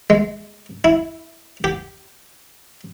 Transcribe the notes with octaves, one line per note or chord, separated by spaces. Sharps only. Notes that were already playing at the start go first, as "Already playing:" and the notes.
G#3
E4
G4